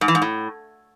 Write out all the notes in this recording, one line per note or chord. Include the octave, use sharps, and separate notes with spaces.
G#2
E3
G#2
A2